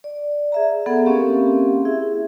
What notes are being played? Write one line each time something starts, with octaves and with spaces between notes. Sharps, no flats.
D5
G#4 E5 A#5
B3 G#4 A4 F#5
A#3 C4 C#4 G4 A#4 F5
E4 G#4 E5